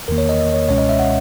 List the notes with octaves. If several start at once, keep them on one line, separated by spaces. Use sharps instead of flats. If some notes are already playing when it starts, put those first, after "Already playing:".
E2 D#3 A#3 A#4
C#5
D#5
D#5
C#5
C#2 B2 G#3 C#4 C#5
D#5
E5
F#5